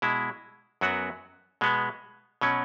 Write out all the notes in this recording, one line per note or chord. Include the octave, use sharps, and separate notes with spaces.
B2 G#3 E4
F#2 F#3 B3 F#4
B2 G#3 B3
B2 F#3 C#4